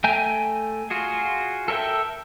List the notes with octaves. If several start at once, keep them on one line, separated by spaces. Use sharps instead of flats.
A3 G5 G#5 A#5 G6
F4 F#4 G#4
A4 A#4 C5 E5 G5